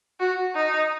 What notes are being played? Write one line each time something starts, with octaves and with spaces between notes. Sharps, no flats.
F#4
D#4